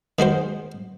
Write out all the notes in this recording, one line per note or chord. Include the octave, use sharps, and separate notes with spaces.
D#3 G#3 F#4 C5